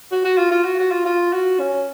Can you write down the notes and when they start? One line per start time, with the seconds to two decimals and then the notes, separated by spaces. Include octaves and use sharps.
0.12 F#4
0.24 F#4
0.38 F4
0.51 F4
0.65 F#4
0.79 F#4
0.91 F4
1.05 F4
1.33 F#4
1.60 C#4